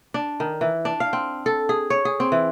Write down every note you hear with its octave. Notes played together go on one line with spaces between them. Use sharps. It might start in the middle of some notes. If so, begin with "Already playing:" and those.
D4
D#3
E3
D4
F5
C4
A4
G#4
C#5
G#4
C4
E3